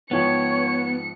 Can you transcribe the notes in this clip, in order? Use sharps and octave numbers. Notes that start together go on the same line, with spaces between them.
G#2 F3 B3 C#5 G5 C#7